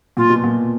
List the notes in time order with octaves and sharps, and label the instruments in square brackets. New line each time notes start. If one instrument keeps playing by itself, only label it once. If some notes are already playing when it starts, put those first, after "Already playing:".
[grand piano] A#2 [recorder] F4
[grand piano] B2
A#2